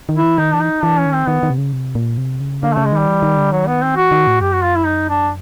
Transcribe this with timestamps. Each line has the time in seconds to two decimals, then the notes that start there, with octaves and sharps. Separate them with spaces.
0.09 D#3
0.16 E4
0.24 E3
0.38 D#3 D#4
0.53 E3 D4
0.61 D#4
0.83 E3 D4
0.98 C#4
1.06 D#3
1.13 C4
1.28 D#3 B3
1.43 D#3
1.50 C3
1.58 C#3
1.73 C3
1.95 A#2
2.18 C3
2.40 C#3
2.63 D3 A#3
2.74 C#3 A3
2.85 G#3
2.92 D#3 G3
3.07 E3
3.22 D#3
3.37 D3
3.51 D#3 F#3
3.67 B3
3.82 C4
3.96 E3 F#4
4.11 D#3
4.27 A2
4.41 F#2 G4
4.52 F#4
4.64 F4
4.76 E4
4.86 D#4
5.09 D4